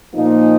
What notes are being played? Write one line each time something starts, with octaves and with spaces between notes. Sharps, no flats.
A#2 F3 A#3 D#4